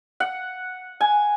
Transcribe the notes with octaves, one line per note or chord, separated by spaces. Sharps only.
F#5
G#5